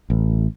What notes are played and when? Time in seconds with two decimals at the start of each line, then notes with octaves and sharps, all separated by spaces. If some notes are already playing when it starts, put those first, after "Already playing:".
0.10 A1